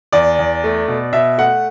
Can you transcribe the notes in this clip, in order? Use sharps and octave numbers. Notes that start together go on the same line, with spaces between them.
E2 D5
E2
A3
B2
B2 E5
A3 F#5